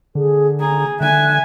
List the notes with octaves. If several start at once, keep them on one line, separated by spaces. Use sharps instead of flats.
D3 G#4
G#4 A#5
D3 E5 G#5 F#6